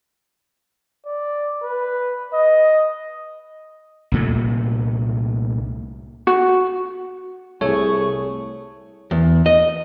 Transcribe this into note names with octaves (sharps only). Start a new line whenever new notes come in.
D5
B4
D#5
C2 A#2 A3
F#4
C2 A3 G#4 C#5 C#6
E2
D#5